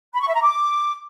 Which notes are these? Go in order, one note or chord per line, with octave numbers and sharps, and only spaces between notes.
B5
C#6
E5
A#5
D6